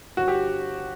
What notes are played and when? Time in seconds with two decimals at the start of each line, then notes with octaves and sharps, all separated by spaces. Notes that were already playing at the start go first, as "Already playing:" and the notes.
0.17 G1 F#4
0.28 G4